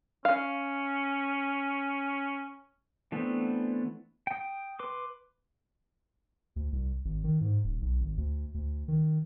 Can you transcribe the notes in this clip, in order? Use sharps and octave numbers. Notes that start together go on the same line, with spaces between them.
C#4 F5
E3 A3 B3 C4 D4
G5 D#6
B4 C6 D6
D2
C2
G#1
D#3
G#2
D#1
B1
G#1
D2
D2
D#3